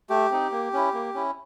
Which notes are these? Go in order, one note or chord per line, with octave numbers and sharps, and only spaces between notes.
A3 G4
C4 D#4
A#3
C#4 E4
A#3
C#4 E4